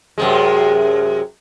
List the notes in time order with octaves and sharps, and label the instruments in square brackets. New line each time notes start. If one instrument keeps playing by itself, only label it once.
[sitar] F#2 C3 G#3